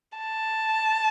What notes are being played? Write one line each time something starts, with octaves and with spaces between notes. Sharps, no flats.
A5